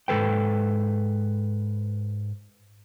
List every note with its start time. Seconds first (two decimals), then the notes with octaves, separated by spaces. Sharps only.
0.08 G#2 E3 A4 B4 G5